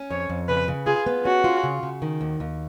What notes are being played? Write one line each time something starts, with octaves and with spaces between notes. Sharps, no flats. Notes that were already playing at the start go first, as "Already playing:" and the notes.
Already playing: C#4
F2 C#5
F2
C#3 B4
C#3
F4 G#4
B3
C#4 F#4
F4
C#3
C#3
D#3
D#2
D#2